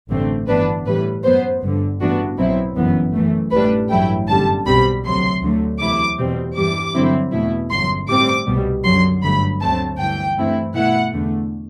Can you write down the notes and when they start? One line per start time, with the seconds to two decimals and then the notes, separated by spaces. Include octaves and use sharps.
0.09 A1 G2 D3 A3 C4
0.47 G1 G2 E3 B3 D4 B4
0.86 A2 E3 G3 B4
1.23 F#2 F#3 B3 C5
1.62 G1 G2 D3
2.00 A1 G2 E3 B3 D4 F#4
2.38 B1 B2 F#3 C4 E4
2.76 G1 F#2 E3 B3
3.13 F#2 E3 A3
3.51 A1 A2 G3 D4 B4
3.90 A1 G2 F#3 A3 E4 G5
4.27 G1 F#2 D3 G3 A5
4.66 B1 B2 G3 C4 B5
5.04 D2 C3 F#3 C6
5.42 D2 D3 F#3 A3
5.80 E2 C3 F#3 A3 E4 D6
6.18 E2 B2 G3 C4
6.56 G2 E3 G3 D6
6.94 G2 D3 F#3 C4 E4
7.32 E2 B2 A3 E4
7.70 G1 F#2 F#3 C6
8.08 A2 G3 C4 D6
8.46 C2 B2 G3
8.84 F#2 D3 F#3 C6
9.22 G1 G2 D3 F#3 A3 B5
9.60 D2 D3 F#3 A3 C4 A5
9.98 G1 G2 E3 G5
10.36 G2 E3 A3 C4 E4
10.75 B2 A3 E4 F#5
11.12 E2 D3 A3